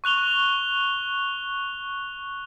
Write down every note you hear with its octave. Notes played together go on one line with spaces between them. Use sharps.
C#6 F#6 F7 G7